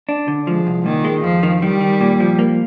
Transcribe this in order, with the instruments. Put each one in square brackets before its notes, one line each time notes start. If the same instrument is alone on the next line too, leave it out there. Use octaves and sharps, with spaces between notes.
[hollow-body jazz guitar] D4
D3
[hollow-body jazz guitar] F3 [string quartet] G#3
[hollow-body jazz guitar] C2
[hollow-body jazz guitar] A#2 [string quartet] D#3
[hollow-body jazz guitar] G#3
[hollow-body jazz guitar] F2 [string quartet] F3
[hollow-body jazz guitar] D#3
[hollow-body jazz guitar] D#3 [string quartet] G3
[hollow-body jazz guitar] D#3
A#2
F3
A#3